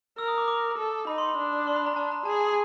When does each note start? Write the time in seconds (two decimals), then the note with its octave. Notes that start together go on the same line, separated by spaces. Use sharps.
0.18 A#4 E6
0.28 D#6
0.38 D6
0.48 D6
0.78 A4
1.07 D#4 B5
1.18 C6
1.29 B5
1.36 D4
1.67 C6
1.76 B5
1.86 A#5
1.96 D4 A5
2.12 A#5
2.25 G#4 A5
2.40 A5